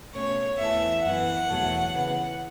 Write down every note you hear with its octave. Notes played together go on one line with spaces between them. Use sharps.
B2 A3 C#4 C#5
E2 E3 A3 E5
F#2 E3 B3 F#5
E2 B2 F#3 A3
C#3 E3 B3